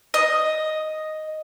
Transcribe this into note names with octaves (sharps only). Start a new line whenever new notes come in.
D#5